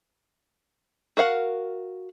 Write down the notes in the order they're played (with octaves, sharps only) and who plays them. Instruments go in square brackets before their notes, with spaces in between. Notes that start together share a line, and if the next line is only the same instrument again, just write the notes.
[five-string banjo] F#4 A#4 F5 F#5